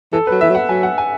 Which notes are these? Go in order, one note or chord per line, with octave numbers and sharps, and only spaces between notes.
E3 A4
F#3 B4
E3 E5
F#3
F#5
F#3 G#5
F#5
G#5